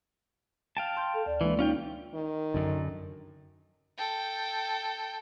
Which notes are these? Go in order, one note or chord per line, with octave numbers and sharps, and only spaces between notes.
F5 G5 A5
C6 F6 G6
A4
D2 D5
E3 G#3 A#3 D4
C#4 D#4 F4 G5
D#3
F#2 D3
A4 G5